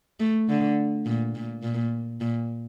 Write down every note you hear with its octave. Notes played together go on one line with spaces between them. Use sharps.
A3
D3
A#2
A#2
A#2
A#2